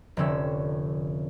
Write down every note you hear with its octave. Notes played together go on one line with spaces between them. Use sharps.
F1 D3 C4 C#4 E6